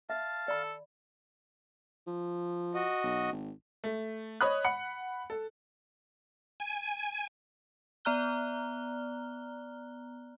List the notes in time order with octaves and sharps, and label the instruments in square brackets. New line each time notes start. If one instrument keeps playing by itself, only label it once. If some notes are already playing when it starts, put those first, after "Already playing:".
[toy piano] E5 [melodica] F5 A5
[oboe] A4 [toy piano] D5 B5
[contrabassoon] F3
[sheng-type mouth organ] F#4 D#5
[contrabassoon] B1
G#1
[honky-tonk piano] A3
C#5 D#5 B5 D#6 F#6
F#5 B5 C#7
A4
[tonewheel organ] G#5
[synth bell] B3 D5 A#5 F6 F#6 G7